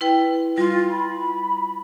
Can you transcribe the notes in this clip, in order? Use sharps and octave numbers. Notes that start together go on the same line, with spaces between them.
E4 B4 G5
G3 F4
B5